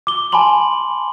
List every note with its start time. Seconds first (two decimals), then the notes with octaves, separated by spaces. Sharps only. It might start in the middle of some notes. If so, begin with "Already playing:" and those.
0.07 D6 G7
0.32 G#5 A5 B5 C6 F#7